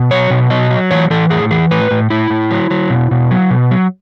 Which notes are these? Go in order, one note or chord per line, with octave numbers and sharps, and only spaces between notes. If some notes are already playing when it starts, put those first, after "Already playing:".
Already playing: B2
F#3 C#5
B2
F#3 D#5
F#3
E3 C#5
E3 A4
A2 G#4
E3 G#4
A2 B4
A2
A2 E4
A2
F#3
F#3
B2
B2
F#3
B2
F#3